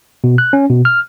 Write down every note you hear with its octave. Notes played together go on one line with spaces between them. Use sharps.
B2
F#6
C#4
B2
F6